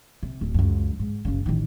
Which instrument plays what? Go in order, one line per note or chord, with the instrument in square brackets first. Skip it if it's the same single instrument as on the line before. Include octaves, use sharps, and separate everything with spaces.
[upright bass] C3
D1
C#2 F#2
G#2
F#1 C#3
A1 D#3